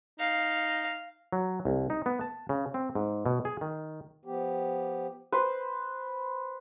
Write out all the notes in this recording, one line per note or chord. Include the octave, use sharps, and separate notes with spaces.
D#4 F5
F#3
C2
D#4
B3
A5
C#3
C4
G#2
B2
G#4
D#3
F3 B3 G4
B4 C5